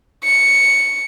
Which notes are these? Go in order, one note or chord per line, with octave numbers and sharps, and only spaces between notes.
C#7